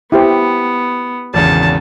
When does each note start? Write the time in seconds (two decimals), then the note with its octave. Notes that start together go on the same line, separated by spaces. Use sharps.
0.12 B3 E4 G4 C5
1.34 G#1 E2 C#3 A5